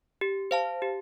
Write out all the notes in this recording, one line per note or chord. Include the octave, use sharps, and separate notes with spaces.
G4
C5 F5 A5
G4